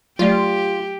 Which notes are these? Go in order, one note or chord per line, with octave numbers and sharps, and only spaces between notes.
F#3 A3 F4 G4 D5